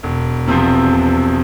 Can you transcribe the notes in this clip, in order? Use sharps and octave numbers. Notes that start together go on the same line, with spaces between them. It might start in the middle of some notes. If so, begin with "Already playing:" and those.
E1
E2 C3 F3 C4
E1